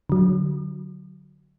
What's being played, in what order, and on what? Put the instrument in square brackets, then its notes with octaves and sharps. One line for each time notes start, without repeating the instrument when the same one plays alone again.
[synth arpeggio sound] D3 F#3